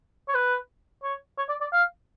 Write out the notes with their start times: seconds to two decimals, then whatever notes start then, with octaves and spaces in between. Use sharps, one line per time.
0.29 C#5
0.34 B4
1.03 C#5
1.38 C#5
1.49 D5
1.61 D5
1.73 F5